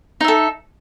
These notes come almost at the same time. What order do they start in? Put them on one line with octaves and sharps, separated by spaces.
D#4 E5 A4